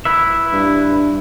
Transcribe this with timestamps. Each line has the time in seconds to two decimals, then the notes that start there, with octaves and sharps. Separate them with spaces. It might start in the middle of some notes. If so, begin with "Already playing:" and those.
0.05 E4 B4 E5
0.53 G2